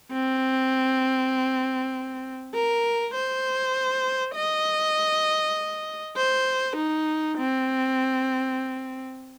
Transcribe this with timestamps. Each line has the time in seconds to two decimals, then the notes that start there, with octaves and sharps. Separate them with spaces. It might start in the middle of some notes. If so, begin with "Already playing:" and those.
0.13 C4
2.55 A#4
3.15 C5
4.36 D#5
6.17 C5
6.77 D#4
7.38 C4